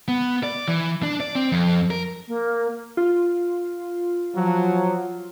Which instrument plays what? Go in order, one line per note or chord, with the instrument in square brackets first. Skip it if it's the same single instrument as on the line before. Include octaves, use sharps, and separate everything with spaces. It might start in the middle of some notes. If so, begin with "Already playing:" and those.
[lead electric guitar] B3
D5
E3
D4
D5
C4
F2
A#4
[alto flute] A#3
[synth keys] F4
[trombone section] F3 F#3